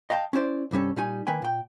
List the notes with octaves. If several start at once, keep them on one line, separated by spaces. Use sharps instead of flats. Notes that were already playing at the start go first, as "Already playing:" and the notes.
D#5 F5 G5 A5
C#4 E4 C5 D5
C2 G2 G3 C#4 A4
A#2 G3 D#4 G#5
D#3 A#3 B4 G5 G#5
A#2 G5